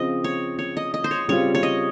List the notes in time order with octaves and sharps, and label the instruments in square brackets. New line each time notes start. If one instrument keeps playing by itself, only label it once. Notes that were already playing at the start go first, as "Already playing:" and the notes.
Already playing: [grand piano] C#3 F3 C4 [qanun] D#5
[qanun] C#5
C#5
D#5
D#5
C5
C#5
[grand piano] C#3 G3 C4 F4 [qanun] C#5
[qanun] C#5
D#5